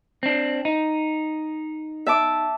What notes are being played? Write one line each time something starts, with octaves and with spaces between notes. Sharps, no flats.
C4 D4
D#4
E5 A5 D6